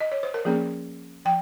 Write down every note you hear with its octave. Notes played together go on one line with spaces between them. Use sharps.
D#5
C#5
C5
A#4
F3 A#3 C#4 G#4
F3 G5